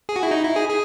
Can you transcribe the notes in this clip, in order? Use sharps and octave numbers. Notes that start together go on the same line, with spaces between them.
G#4
F#4
E4
D#4
E4
G#4
G#4